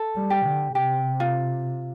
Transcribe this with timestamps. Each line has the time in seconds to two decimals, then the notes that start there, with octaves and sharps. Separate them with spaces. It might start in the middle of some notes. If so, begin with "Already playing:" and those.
Already playing: A4
0.16 G3
0.30 G4
0.46 D3
0.75 C3 G4
1.20 F4